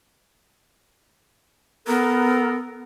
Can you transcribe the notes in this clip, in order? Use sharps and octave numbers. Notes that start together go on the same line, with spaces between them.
B3 A4 A#4